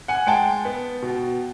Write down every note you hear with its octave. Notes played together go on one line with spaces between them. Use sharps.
F#5 G#5
G#3 G5 A5
B3
B2